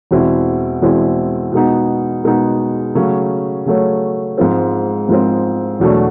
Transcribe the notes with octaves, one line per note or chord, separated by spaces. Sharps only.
E2 B2 G#3 C4 E4
E2 B2 G#3 C4 E4
B2 G#3 B3 D#4
B2 G#3 B3 D#4
C#3 F#3 A3 C#4
C#3 F#3 A3 C#4
G#2 F3 G#3 C4
G#2 F3 G#3 C4
E2 B2 F#3 A3 D4